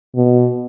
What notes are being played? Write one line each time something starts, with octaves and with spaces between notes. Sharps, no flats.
B2